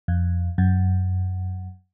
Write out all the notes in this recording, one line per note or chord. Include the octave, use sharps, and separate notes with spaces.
F2
F#2